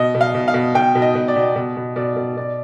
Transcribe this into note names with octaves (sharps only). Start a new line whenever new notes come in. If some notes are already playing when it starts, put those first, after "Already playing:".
Already playing: B2 D#5
B2
F5
B2
F5
B2
B2 G5
B2
D#5
B2
D5
B2
B2
B2
B2 D5
B2
B2 D5